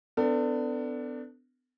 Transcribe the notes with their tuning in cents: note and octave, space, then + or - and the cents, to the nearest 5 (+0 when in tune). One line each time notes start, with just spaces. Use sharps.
B3 +35 D4 +0 A4 +35